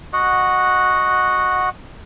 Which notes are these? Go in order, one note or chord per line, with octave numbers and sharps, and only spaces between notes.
F#4 D#5 F#5